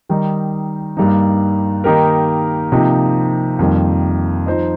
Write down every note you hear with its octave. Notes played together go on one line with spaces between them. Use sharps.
D#3 G3 D#4
G2 G3 A#3 D#4
D#3 A#3 D#4 G4 A#4
C3 F3 A#3 D#4 G4
F2 D#3 G3 A#3
F3 D#4 C5 D#5